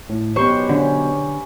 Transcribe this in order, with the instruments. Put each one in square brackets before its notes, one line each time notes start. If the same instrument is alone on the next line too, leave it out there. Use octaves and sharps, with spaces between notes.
[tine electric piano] A2
[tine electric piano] B2 F#3 [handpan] C#4 G4 B4 [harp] C5 C#6
[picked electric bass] D3 [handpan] C#4